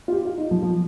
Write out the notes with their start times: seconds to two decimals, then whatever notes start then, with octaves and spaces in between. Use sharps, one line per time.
0.08 F4
0.13 G4
0.25 F4
0.38 D#4
0.51 F3
0.62 F3